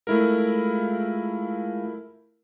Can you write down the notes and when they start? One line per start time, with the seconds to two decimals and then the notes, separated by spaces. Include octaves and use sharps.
0.07 G#3 A3 E4 F4 A#4